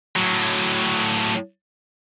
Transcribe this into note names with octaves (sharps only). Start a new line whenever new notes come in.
A2 F#3